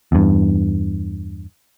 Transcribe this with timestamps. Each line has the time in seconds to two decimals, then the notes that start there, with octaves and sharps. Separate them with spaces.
0.12 E2 G2